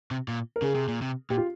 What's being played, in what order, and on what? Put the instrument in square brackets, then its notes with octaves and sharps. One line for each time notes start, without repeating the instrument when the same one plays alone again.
[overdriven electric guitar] C3
A#2
[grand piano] A#4
[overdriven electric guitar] C#3 [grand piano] G#4
[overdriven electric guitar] C3
A#2
C3
[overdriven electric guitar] A#2 [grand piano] G4
[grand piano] F4